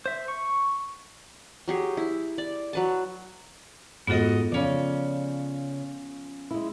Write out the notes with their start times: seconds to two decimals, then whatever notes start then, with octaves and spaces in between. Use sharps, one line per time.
0.06 C5 E5
0.28 C#6
1.68 F#3 G4 G#4
1.97 E4
2.38 D5
2.73 F#3 B4 A5
4.07 G#2 B3 F4 F#4 A4 D#5
4.52 C#3 F3 C#4 D5
6.51 G#3 E4